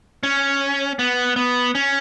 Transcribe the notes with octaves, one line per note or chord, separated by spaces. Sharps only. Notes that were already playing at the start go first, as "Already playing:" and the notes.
C#4
B3
B3
C#4